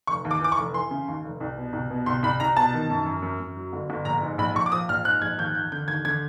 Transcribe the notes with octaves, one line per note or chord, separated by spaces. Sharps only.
F1 C#6
D#2
D6
E3 D6
C#6
F1
E3 C6
C#3
D#2
F1
C2
B2
C2
B2
C2 C6
C2 B5
C2 A#5
B2 A5
D#3
F#2
F#2
F#2
F#2
F#3
G1
G1
A#1 A#5
G#2
A#1 B5
A#1 C#6
D6
F3 D#6
A#1 F6
G#2 F#6
A#1 G#6
D#2 G6
D#2 G6
D3 G6
D#2 G#6
D3 G#6